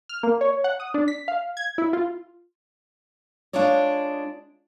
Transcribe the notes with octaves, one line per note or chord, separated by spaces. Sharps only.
F6
A#3
C#5
F#5
D#6
D4
B6
F5
G#6
E4
F4
G#3 D4 F4 G#4 C#5 D5